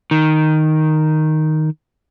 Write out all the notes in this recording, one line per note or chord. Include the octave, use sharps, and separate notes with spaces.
D#3